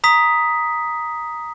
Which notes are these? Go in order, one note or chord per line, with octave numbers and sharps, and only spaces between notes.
A#5 D#6 B6